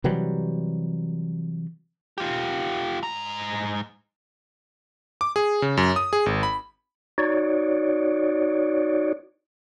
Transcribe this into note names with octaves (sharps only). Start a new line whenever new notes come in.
C3 E3 F#3 G3
F4 G4
G#2 A#5
D6
G#4
C#3
F#2
D#6
G#4
G#1
B5
D#4 F#4 C#5 D5